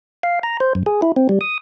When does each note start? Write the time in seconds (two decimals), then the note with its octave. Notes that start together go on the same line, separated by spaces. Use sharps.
0.23 F5
0.43 A#5
0.60 C5
0.75 F#2
0.86 G#4
1.02 E4
1.16 C4
1.29 G3
1.41 D#6